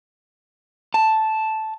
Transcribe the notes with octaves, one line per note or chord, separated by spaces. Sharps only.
A5